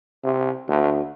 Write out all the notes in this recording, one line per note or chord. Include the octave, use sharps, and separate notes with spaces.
C3
D2